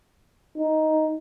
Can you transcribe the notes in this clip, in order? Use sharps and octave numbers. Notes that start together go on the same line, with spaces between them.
D#4